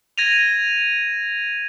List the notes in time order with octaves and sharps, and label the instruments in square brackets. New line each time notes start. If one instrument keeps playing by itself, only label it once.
[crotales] G#6 A#6 D#7 F7